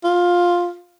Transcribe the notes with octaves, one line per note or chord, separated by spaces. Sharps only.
F4